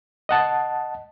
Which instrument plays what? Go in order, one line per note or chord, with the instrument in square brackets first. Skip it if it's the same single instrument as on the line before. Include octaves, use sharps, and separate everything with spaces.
[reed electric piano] D#5 F#5 A5